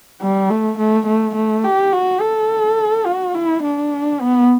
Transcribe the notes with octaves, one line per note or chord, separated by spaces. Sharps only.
G3
A3
A3
A3
A3
G4
F#4
A4
F#4
E4
D4
B3